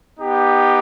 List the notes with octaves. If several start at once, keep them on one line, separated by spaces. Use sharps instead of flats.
B3 D#4 G4